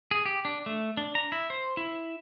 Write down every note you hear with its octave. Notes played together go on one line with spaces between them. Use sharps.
G#4
G4
D4
A3
D4
A#5
E4
C5
E4